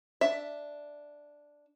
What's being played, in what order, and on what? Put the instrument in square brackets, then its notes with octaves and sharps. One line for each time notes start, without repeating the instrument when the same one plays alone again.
[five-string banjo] D4 E5